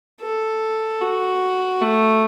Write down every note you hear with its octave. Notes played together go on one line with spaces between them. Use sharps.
A4
F#4
A3